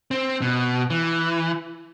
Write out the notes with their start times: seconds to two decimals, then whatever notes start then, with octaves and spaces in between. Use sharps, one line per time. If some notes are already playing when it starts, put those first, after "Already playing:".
0.11 C4
0.42 B2
0.90 E3